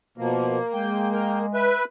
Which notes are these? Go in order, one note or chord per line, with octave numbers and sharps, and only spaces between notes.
B2 F3 A#3
G#3 G5
A#4 G5
B4 E5